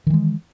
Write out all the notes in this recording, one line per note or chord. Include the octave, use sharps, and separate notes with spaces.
D#3 E3 G#3